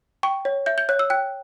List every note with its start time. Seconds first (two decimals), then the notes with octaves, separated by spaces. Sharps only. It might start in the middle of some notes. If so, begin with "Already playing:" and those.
0.23 G5 C#6
0.45 C#5
0.66 E5 G6
0.78 G6
0.89 C#5 F#6
0.99 E6
1.10 G5 F#6